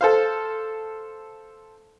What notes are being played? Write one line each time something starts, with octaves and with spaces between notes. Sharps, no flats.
A4 C5 F5